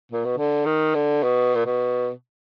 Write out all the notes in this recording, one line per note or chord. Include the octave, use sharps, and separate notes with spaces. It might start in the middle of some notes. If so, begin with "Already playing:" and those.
A#2
B2
D3
D#3
D3
B2
A#2
B2